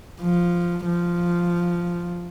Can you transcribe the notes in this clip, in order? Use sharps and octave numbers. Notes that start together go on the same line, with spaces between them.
F3
F3